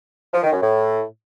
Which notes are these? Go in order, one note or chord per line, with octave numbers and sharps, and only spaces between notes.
F3
D#3
F#2
A2